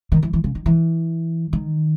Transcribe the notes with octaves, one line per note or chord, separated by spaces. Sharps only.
D#3
E3
E3
C#3
D#3
E3
D#3